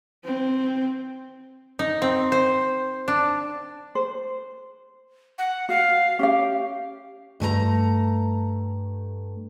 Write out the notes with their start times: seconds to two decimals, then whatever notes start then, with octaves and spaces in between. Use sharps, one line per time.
0.25 C4
1.79 D#4
2.02 C4
2.32 C5
3.08 D4
3.95 C5
5.38 F#5
5.69 F#4 F5
6.19 C#4 G4 F5
7.40 G2 A3 A#4 A#5